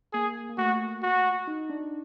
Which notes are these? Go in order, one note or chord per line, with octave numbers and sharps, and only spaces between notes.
A#3 G#4
A#3
A3 F#4
F#4
D#4
D4